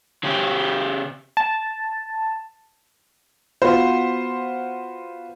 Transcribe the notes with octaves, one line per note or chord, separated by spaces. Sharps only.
C#3 G4
A5
B3 F4 F#4 C5